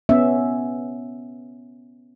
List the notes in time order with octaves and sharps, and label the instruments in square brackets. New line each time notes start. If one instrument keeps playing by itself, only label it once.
[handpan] B3 C#4 E5